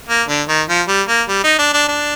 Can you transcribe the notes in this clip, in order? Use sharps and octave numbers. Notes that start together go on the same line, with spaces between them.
A#3
D3
D#3
F3
G3
A#3
G3
D#4
D4
D4
D4